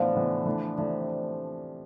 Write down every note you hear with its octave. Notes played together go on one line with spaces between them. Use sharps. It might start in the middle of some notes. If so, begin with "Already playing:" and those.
Already playing: A2 D3 E3 F3 B3
A2 E3 B3
E3 A3 D4
C3 E3 A3 D4